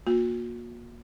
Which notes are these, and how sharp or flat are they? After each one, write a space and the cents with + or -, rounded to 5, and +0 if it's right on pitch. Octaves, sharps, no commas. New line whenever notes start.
A#3 +20 F#4 -45